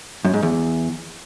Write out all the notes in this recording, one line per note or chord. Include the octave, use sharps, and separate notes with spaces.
F#2
G#2
E2